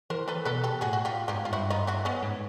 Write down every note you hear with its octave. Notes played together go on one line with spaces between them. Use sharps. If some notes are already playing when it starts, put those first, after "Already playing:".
E3 A#4 C5
A4 B4
B2 A4 B4
G4 A4
A2 F#4 G#4
F#4
F4 G4
G#2 F4 G4
F4
G2 E4 F#4
D#4 F4
E4 F#4
B3 C#4
G#2